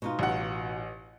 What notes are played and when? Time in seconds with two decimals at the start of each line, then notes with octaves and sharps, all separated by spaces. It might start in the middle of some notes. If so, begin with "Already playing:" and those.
0.02 B2 D#4 F4
0.19 A1 F#5